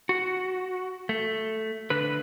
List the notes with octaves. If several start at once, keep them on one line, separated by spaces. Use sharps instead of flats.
F#4
A3
D3 B4